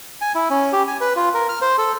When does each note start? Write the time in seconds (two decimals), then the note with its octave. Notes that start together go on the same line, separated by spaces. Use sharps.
0.21 G#5
0.35 E4
0.51 C#4
0.73 G4
0.88 G#5
1.01 B4
1.16 F4
1.34 A#4
1.49 F6
1.62 C5
1.78 A4